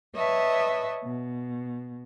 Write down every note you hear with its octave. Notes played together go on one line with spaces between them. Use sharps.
B4 C#5 D#5 E5 A5
B2